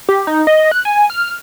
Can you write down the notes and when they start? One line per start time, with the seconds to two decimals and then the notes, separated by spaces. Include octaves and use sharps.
0.09 G4
0.27 D#4
0.47 D#5
0.71 F#6
0.85 G#5
1.10 F6